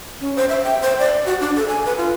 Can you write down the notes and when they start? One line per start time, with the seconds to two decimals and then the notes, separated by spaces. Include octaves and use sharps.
0.21 C#4
0.36 C5
0.49 E5
0.63 G5
0.82 C5
0.99 D5
1.26 F#4
1.41 D4
1.56 A4
1.68 G#5
1.85 B4
1.97 F4